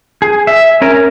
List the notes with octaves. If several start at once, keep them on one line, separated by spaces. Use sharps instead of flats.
G#4
E5
C#4 A#4